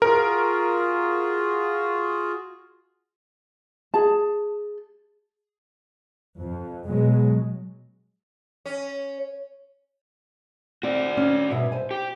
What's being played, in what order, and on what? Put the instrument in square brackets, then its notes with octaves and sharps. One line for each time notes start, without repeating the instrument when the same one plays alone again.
[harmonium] F4 F#4 G#4 [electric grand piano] A#4
[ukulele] G#4 A5
[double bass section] F2
B2 F#3 G#3
[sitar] C#4
[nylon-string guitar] C4 [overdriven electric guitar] F#4 D5
[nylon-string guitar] C#4
G2 B2 E5
C5 G#5
[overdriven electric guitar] G4